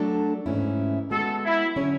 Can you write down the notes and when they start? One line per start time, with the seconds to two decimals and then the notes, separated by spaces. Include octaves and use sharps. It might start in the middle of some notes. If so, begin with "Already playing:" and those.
Already playing: F#3 A3 D4 A4
0.46 G#2 E3 A3 C#4 E4
1.11 G#3 B3 F#4 A4
1.44 E4
1.76 D3 F#3 C#4 G#4 C#5